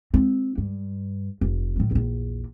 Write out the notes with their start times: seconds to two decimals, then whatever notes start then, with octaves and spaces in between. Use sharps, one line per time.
0.13 G#3 C4
0.58 G2
1.41 F1
1.76 A2 F3
1.91 A#1 E2